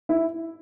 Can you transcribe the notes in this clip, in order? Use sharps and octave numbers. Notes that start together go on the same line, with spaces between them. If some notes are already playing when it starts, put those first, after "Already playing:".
E4